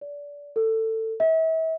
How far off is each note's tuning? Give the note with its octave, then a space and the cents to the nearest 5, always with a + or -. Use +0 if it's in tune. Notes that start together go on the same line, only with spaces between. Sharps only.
D5 -25
A4 +20
E5 -40